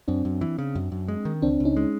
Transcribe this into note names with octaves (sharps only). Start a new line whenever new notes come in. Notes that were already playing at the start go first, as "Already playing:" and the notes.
F#2 C4 D4
F#2
E3
C#3
F#2
F#2
G#3
D#3
C#2 C4 D4
C#2
C#4 D#4
G#3